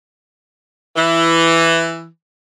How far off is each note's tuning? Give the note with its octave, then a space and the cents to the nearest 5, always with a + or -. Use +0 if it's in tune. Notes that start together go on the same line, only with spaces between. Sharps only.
E3 +10